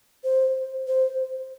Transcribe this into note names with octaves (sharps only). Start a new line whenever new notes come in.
C5
C5